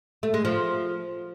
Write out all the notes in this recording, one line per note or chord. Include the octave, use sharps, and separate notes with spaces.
A3
G#3
F3